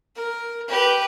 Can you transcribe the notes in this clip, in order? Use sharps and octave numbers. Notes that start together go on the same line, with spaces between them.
A#4
G4 B4